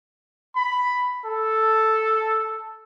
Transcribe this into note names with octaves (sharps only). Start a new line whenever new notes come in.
B5
A4